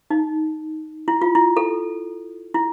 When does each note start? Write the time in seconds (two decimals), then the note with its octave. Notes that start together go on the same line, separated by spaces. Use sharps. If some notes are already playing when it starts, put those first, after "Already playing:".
0.10 D#4
1.08 E4
1.22 F4
1.35 E4
1.57 A4
2.54 E4